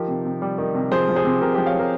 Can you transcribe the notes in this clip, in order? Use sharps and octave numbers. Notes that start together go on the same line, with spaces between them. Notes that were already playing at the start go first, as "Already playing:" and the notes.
Already playing: D#3 F3 G4 A#4
C3
C3
G3
D#3
C3
F3 G#4 C5
F3
G#4 C5
C3
C3 G4 A#4
F3 G4 A#4
C#5 F5
F3 G4 A#4